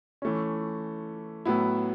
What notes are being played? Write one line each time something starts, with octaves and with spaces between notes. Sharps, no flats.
E3 A3 C#4
A2 F#3 B3 E4